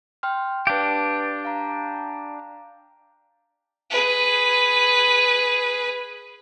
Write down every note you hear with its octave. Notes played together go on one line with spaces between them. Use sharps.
G5 C6 F6
D4 G4 B4 F5
F5 A#5
G#4 B4